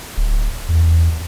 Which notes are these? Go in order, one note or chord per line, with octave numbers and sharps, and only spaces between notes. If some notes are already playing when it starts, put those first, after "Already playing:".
D1
E2